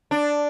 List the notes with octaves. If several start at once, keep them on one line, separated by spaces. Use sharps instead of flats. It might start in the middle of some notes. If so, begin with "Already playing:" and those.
D4